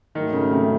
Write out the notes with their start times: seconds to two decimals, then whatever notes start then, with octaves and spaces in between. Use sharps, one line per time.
0.15 G#2 D#3 F#3 A3
0.33 C#3
0.51 C3